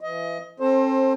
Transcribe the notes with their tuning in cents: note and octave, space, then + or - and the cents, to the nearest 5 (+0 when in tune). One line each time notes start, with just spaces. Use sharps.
E3 +35 D#5 +25
C4 +35 A4 +0 C5 +25